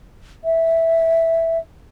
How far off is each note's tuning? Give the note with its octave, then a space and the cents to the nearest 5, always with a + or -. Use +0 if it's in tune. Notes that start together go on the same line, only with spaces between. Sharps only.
E5 -5